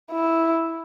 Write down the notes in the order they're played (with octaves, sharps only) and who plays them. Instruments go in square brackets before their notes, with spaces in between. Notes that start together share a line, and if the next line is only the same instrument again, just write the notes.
[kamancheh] E4